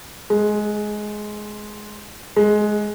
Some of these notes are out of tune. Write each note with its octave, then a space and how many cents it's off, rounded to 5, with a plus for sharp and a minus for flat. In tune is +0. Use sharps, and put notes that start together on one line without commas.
G#3 +15
G#3 +15